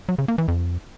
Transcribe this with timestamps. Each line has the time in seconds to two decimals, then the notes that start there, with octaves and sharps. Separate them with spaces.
0.09 F#3
0.18 C#3
0.28 A#3
0.38 E3
0.48 F2